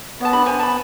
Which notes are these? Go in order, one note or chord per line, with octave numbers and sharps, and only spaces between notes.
B3 C#5 A5
D4 G4 B5
C5 G#5
A5 B5